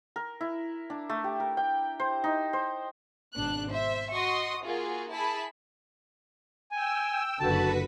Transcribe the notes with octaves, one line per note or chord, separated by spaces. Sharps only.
A#4
E4
D4
A3
G4
A#4
G5
C5
D#4
C5
G#1 B2 D4 F#6
C5 E5
F#4 D#5 C6 C#6 D#6
A#3 F4 F#4 G#4
E4 G#4 A5 B5
G5 G#5 E6
F#1 D3 F#4 B4 A5 B5